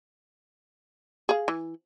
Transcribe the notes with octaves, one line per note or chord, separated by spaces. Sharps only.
G#4 F5
E3